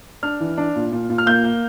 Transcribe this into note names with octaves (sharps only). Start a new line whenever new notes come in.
D4 F6
E3
D4
A#2
A#2
A#2
F6
A#3 G6
A#3